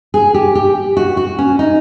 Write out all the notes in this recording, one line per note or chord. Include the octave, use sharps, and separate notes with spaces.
G#4
G4
G4
F#4
F#4
C#4
D#4